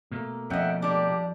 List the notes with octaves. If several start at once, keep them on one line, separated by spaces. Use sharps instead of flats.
B2 A3 A#3
F2 C#4 D#5 E5 F#5 G5
G3 D4 G4